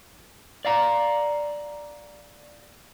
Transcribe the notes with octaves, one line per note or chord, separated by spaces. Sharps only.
D5 F5 A#5